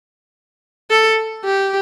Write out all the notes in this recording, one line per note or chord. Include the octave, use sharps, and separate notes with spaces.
A4
G4